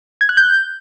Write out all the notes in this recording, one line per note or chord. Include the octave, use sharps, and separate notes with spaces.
G#6
F#6
G6